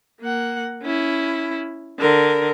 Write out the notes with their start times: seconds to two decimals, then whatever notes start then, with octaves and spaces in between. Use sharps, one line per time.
0.22 A#3 F#5
0.83 C#4 E4
1.99 D3 A#4